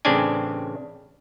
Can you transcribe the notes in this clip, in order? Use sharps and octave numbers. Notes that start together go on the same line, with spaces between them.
A1 C#3 C4 D4 D5 G#5